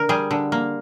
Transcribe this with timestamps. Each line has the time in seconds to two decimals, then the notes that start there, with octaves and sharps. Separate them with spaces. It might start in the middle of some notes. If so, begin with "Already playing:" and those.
Already playing: D3 A#4
0.09 G3 G#4
0.31 D3
0.52 A#3